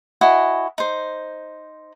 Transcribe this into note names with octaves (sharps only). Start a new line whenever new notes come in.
E4 F#4 D#5 G#5
D#4 C5